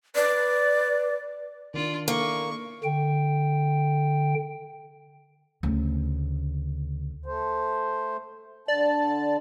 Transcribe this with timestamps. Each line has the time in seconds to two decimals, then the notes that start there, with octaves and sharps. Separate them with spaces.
0.15 B4 D5
1.74 D#3 D4 F4 D5
2.08 A#3 E4 A4 C#6
2.84 D3 G5
5.63 D2 C#3
7.26 A3 C5
8.68 D3 D5 A5